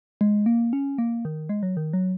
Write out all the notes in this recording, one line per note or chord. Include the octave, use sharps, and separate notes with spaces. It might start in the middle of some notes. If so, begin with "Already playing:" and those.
G#3
A#3
C#4
A#3
D#3
G#3
F#3
D#3
F#3